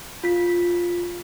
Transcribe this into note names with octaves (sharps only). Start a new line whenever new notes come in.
F4 B6